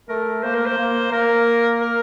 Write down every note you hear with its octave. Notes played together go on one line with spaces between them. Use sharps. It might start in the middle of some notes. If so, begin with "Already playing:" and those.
A3 A#4
A#3 C5
A#4
C5
A#3
A#3 A#4
A#4